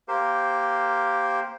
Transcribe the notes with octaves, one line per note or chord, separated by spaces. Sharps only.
A#3 G4 A#4 C5